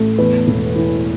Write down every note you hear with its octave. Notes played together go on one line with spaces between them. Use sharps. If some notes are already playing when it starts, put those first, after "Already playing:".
Already playing: A1 A3
E2 B4
E1
E3